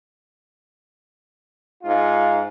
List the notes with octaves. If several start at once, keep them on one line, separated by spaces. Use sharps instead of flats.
G#2 F4